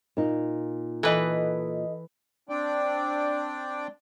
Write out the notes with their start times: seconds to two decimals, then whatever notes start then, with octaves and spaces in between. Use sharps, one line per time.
0.17 A#2 D#4
1.03 E3 A4 B4 D#5
2.49 C4 D4 D5 G5